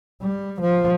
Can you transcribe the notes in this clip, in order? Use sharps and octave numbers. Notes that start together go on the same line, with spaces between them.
G3
F3